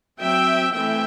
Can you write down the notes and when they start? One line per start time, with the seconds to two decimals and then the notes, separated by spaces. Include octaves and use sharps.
0.20 F#3 C4 E5 G5
0.73 E3 A3 C4 E5 G5